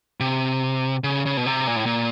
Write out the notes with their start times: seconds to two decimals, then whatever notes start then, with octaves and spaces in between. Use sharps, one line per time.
0.20 C3
1.04 C#3
1.26 C#3
1.37 B2
1.46 C3
1.67 A#2
1.76 A2
1.86 A#2